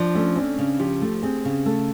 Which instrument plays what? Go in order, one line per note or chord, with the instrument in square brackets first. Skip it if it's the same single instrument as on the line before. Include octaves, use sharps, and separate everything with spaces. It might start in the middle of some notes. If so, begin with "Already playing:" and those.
Already playing: [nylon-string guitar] F3 [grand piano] D4
[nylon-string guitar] A3 [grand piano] C#4
[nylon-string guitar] C4 [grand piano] C#4
[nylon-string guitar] C#3
[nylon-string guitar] F3 [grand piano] G4
[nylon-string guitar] A3
[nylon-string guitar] C4 [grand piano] G#4
[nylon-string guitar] C#3
[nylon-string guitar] A3 [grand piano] A4